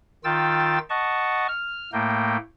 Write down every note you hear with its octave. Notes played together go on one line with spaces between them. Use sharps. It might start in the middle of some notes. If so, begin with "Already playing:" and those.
D#3 F4 G5 E6 A6
D#5 F#5 A5 C#6
F6
A2 A3 A#3 G5